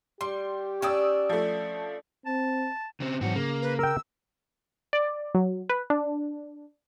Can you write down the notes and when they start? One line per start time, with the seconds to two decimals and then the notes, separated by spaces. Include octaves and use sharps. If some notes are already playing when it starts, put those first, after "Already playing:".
0.21 G3 G4 C6
0.82 C#4 D4 D5 G5 D#6 E6
1.29 F3 A3
2.26 C4 A5
3.00 C#3 C4
3.21 G#2 E3 F#3 C4 F#4
3.35 C#3 A#3
3.62 B4
3.79 A#4 G5 E6
4.93 D5
5.35 F#3
5.69 B4
5.90 D4